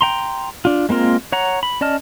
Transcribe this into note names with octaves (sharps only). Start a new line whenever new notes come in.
G5 A#5 C6
D4 F4
G#3 A#3 C4 F4 A#4
C#5 F#5 A#5
B5
C#4 D5 D#5 A5 F6